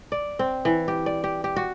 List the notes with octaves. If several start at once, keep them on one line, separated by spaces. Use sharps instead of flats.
D5
C4
E3
G4
D5
G4
G4
F#4